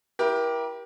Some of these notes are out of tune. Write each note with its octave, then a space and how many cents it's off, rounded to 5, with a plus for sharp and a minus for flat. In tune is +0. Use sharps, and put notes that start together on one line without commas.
E4 +15 G4 +0 A#4 +35